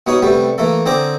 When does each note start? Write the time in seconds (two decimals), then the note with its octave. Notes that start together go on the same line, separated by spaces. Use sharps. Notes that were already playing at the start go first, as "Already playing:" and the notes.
0.07 B2 B3 D#4 G#4 C#5 D#6
0.22 C3 G3 A3 B3
0.58 E3 A3 A#3 A4
0.86 D3 C4 G#4 C5 A#5 D6